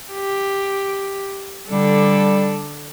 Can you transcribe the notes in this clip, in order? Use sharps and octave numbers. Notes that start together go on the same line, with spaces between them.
G4
D3 G3 D4 A4